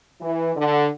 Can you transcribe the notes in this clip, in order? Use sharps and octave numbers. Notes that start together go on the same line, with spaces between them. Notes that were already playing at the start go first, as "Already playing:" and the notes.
E3
D3